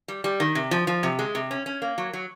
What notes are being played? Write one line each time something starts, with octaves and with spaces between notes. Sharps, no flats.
G3
G3
D#3
C3
F3
F3
C3
G#3
C3
C#4
C#4
A#3
F#3
F#3